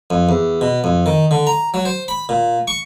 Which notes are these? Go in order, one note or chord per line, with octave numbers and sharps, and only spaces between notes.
F2
E2
B2
F2
D#3
D3
A#5
F#3
C5
B5
A#2
C#6